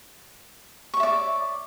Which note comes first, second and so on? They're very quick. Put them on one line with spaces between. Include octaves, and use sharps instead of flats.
C#6 C#5 E5 D5